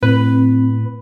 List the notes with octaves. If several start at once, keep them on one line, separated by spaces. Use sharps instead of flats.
A2 C4 B4